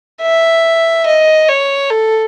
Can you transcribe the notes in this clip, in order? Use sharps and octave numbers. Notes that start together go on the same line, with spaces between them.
E5
D#5
C#5
A4